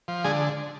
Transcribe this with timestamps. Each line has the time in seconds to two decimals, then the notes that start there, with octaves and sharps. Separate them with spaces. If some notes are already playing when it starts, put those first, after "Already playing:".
0.08 F3
0.24 D3 G#3 G#4